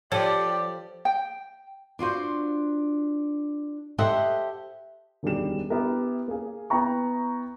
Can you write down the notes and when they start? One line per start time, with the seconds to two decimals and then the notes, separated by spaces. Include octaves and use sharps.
0.12 F3 G4 A4 C#5 D5
1.05 G5
1.99 D4 F4 F#4 C5
3.98 G4 A4 C5 D#5 E5 F#5
5.23 E1 F#2 D#3 G3 G#4 E7
5.70 B3 E4 G4 A#4
6.28 A#3 C#4 G#4 F5
6.70 B3 E4 G5 A#5 C#6